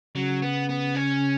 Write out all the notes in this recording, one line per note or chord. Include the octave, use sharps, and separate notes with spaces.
C#3 F#3
B3
B3
C#4